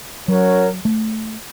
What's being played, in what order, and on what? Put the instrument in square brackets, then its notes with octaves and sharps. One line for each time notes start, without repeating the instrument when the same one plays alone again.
[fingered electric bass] F#3 [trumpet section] C#4 F#4 A#4 C#5
[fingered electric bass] A3